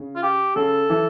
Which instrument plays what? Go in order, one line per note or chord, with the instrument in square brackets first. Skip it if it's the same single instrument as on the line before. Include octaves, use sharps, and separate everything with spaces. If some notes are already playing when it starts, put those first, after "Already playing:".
Already playing: [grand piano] C#3
[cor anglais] F4
G4
[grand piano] C#3 [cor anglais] A4
[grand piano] E3